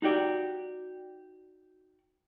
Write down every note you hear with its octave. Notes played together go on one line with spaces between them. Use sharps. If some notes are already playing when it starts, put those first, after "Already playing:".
D#4 F#4 G4 D5